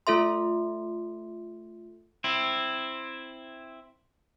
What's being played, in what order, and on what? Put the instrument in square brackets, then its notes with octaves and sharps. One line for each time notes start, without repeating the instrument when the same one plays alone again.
[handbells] A3 F4 A4 E5 C6
[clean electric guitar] C4 E4